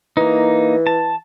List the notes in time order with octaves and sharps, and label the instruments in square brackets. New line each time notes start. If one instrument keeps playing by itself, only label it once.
[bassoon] E3 [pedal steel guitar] A#3 D#4
[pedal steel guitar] A5